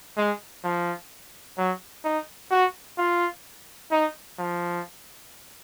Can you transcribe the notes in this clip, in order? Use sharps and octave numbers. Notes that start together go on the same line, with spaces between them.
G#3
F3
F#3
D#4
F#4
F4
D#4
F3